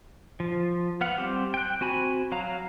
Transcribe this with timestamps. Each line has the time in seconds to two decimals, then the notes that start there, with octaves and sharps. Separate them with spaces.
0.40 F3
1.01 B3 F5 F#5
1.18 G3 C4 G4
1.54 G5 F#6
1.81 C4 F#4 G#5 B5
2.32 F#3 F5 A#5